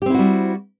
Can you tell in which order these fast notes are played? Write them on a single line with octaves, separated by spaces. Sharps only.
G4 C4 E4 F#4 G3